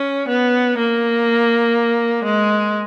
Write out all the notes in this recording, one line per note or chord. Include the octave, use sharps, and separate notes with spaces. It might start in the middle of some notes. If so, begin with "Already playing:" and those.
Already playing: C#4
B3
A#3
G#3